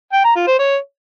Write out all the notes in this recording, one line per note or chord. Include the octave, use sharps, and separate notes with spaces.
G5
A#5
F4
C5
C#5